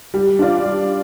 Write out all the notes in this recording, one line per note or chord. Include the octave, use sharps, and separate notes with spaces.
G3
D4 F4 D5
G3